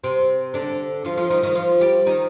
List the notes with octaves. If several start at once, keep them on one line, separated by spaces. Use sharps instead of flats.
C3 C4
D3 D4
F3 F4
F3 F4
D#3 D#4
D#3 D#4
F3 F4
G3 G4
D#3 D#4